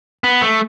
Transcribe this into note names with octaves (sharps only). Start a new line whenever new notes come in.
B3
A3